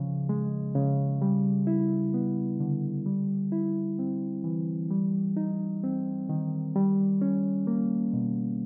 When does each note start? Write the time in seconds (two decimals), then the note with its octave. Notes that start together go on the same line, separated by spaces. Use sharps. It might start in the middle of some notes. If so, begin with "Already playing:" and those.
Already playing: C#3 F3
0.29 G#3
0.75 C#3
1.22 G3
1.67 E4
2.14 B3
2.60 D3
3.06 G3
3.52 E4
3.99 C4
4.44 E3
4.91 G3
5.37 D#4
5.83 C4
6.29 D#3
6.75 G3
7.22 C#4
7.67 A#3
8.13 B2